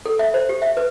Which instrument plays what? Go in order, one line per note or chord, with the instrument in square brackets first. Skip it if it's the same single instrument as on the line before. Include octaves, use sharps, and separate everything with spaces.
[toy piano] A4
E5
C5
G4
E5
B4